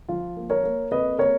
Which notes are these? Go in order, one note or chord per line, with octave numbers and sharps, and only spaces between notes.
F3 F4
A#3
A#4 C#5
A#3
F2 B4 D#5
A#3 A#4 C#5